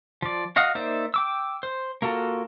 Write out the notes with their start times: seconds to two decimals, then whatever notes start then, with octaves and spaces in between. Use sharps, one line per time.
0.22 F3 D5
0.56 F#4 D#5 F5 F#5 D#6
0.75 A#3 D#4 C5 D5 E5
1.14 G5 D6 E6
1.63 C5
2.02 A#3 F4 F#4 A4